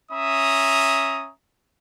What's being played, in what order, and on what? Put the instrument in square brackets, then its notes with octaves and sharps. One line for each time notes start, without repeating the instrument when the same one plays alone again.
[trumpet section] C#4 E5 A#5 D#6